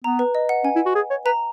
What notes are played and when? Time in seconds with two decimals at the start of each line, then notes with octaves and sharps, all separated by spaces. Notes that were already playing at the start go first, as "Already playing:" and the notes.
0.04 B3 A#5
0.19 B4
0.35 D#5
0.49 F#5
0.64 C#4 G#5
0.75 E4
0.86 F#4
0.95 G#4
1.10 C#5
1.25 B4 A#5